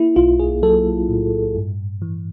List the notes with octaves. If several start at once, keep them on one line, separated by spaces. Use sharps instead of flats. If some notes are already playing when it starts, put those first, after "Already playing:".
Already playing: A#3 E4
B1 F4
G#4
F#3 A4
A2
G2
E3